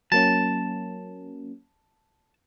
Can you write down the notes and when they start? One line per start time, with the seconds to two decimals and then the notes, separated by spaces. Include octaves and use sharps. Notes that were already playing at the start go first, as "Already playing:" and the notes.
0.12 F#3 A#3 C#4 A5